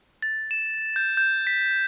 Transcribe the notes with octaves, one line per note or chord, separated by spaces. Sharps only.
A6
E7
G6
G6
B6